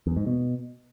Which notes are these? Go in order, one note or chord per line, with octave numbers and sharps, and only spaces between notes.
E2
G#2
B2